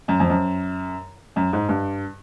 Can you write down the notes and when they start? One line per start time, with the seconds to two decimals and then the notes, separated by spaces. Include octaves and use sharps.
0.08 F#2
0.20 F2
0.29 F#2
1.36 F#2
1.53 G#2
1.69 G2